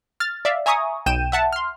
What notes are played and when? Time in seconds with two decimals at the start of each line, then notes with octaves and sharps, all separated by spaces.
0.20 F6 A6
0.45 D5 E5 F5
0.66 E5 G#5 A#5 C#6 D#6
1.06 B1 G5 G6 D#7 E7
1.32 E5 F#5 A5
1.53 C6 F6